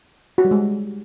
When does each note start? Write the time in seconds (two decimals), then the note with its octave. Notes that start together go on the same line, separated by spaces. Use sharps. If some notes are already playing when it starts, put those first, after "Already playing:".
0.38 F#4
0.45 G3
0.51 G#3